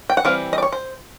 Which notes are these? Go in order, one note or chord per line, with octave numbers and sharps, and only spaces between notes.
G5
F#5
E3 G3 C4 F5
D#5
D5
C#5
C5